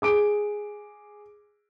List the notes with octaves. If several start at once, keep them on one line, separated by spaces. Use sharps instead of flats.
G#4 D6 D7